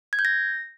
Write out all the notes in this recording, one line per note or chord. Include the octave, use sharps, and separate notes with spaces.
G#6
G6
A#6